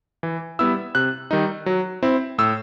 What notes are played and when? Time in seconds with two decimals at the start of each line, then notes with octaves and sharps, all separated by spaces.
0.23 E3
0.59 G3 B3 E4 E6
0.95 C3 F#6
1.31 D#3 G3 D#4
1.66 F#3
2.03 C4 E4
2.38 A2 E6